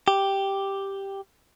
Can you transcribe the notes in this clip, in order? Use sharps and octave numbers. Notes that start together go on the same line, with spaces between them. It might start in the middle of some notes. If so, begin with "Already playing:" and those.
G4